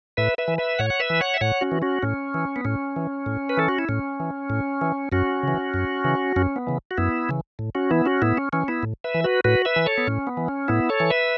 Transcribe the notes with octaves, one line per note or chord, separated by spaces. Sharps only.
A2 B4 E5
B4 E5
E3
B4 E5
A2 C#5 F#5
F#5
B4 E5
E3
C#5 F#5
E5
A2 C#5 F#5
C#4 F#4
E3
C#4 F#4
A2 C#4
E3
B3
A2 C#4
E3
A2
B4
E3 A4
F#4
E4
A2 C#4
E3
A2
E3
F#2 C#4 F#4
C#3 E3
F#2
C#3 E3
F#2 C#4
B3
C#3 E3
F#4
F#2 B3 E4
C#3 E3
A2
C#4 F#4
E3 B3 E4
C#4 F#4
A2 B3 E4
C#4
E3 C#4
B3 E4
A2
B4 E5
E3
F#4 B4
A2 F#4 B4
B4 E5
E3
A4 C#5
B3
A2 C#4
B3
E3
C#4
A2 B3 E4
A4 C#5
E3
B4 E5